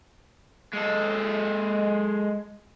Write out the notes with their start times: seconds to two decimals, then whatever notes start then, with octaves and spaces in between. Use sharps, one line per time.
0.73 G#3 A4